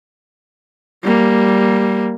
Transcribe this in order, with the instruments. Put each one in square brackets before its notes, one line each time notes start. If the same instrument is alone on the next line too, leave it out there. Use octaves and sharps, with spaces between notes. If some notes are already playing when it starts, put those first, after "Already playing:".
[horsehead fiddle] G3 A#3